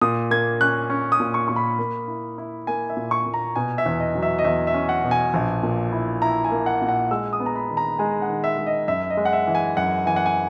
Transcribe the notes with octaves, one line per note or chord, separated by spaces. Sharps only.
A#2 D#6
A#3 G#6
C#4 F#6
C#4
D#6
A#2
C#6
A#2 C#6
B5
A#3
E4
E4
A#3 G#5
E5
A#2
C#6
A#2
A#5
B2 G#5
E5
E2
D#5
F#3
E5
D#5
E2 E5
E5
C#4
F#5
B2
G#5
A#1
A#2
E4
E4 A#5
G#5
A#3
F#5
A#2
F#5
G#3 E6
D#6
B3
A#5
B5
D#3
A#5
G#3 G#5
F#5
D#3
E5
G#3
D#5
F#2 E5
D#5
G#3
F#5
E5
E3
G#5
F#2 F#5
E3 G#5
F#5
G#5